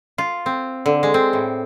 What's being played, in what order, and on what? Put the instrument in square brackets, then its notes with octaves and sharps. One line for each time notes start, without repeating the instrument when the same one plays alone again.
[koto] F4
C4
D3
G#3
C4
A2